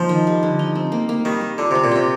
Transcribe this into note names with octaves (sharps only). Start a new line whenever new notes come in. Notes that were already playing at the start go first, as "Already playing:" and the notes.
Already playing: F3 A#3 D#4
D#3
G3
D3
D#4
C4
A#3
A#3
D#3 G3
G3
D3 F4
C3 C4
A#2
C3 G4